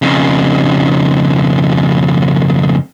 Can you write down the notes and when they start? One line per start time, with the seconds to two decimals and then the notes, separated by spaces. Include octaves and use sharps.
0.02 F2 C#3